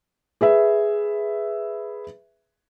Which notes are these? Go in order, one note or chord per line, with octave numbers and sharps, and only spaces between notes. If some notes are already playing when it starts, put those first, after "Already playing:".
G#4 B4 E5